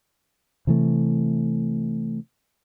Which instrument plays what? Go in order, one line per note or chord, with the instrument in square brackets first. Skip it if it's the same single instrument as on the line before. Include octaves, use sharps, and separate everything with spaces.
[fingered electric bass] C3 E3 A3